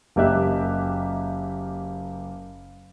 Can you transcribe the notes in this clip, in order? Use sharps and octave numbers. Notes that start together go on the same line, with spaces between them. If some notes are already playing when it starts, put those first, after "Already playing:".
F#1 A#3 G4 D#5 E5 F#6